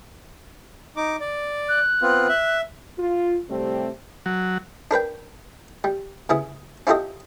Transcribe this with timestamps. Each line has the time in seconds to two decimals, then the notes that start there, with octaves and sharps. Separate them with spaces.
0.96 D#4 D6
1.20 D5
1.69 F#6
2.02 B3 C4 F4
2.29 E5
2.98 F4
3.49 A2 C3 G3 A3 C4 G4
4.26 F#3
4.91 D4 A#4 B4 G5
5.84 G3
6.29 C#3 B3 E4 G#4
6.87 C#4 E4 F4 G4 A4 D#5